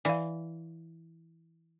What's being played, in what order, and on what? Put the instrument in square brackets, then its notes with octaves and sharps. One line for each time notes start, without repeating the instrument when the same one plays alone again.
[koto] E3 [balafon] D5 F5